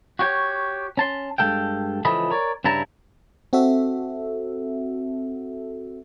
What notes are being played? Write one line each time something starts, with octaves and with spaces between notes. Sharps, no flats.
F#4 G4 C#5
C#4 A5 C6
G2 F#3 G#3 A4 F5 G5
C#2 E3 F3 A4 D#5 B5
A#4 C#5 D5
G2 C#3 E4 A5 A#5
C4 F#4 A4 E5